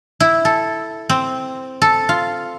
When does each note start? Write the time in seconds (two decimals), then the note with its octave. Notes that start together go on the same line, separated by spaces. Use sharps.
0.20 E4
0.45 A4
1.09 C4
1.82 A4
2.09 F4